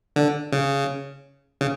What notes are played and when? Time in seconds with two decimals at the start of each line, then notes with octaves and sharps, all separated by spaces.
0.16 D3
0.52 C#3
1.61 C#3